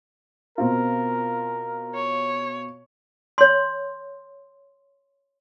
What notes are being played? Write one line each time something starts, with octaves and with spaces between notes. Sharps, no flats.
B2 C4 F4 A#4
C#5
C#5 C6